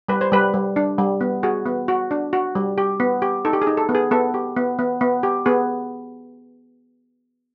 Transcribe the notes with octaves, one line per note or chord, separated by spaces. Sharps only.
G3 B4
C5
G3 B4
G3
D4
G3
B3
F#4 G#4
B3
F#4
D4
F#4
G3
G4
B3
G4
D#4 A4
G4
G#4
D#4
A4
B3
G#4
B3 A4
G4
B3
B3
B3
G4
B3 G#4